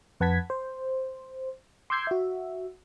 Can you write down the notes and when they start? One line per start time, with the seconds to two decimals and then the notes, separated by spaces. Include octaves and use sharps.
0.20 F2 B4 F#5 A5 G#6 B6
0.50 C5
1.90 C6 D6 E6 G6 G#6 C7
2.07 F#4 E5